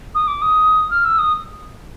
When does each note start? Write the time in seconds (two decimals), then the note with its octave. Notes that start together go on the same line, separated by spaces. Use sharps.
0.15 D#6
0.28 D6
0.42 D#6
0.91 F6
1.05 E6
1.19 D#6